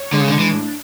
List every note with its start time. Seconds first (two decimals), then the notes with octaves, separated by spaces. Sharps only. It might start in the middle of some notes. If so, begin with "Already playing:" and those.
Already playing: C#5
0.13 D3 G#3
0.21 C#3
0.29 D3
0.33 D4
0.39 E3
0.52 A2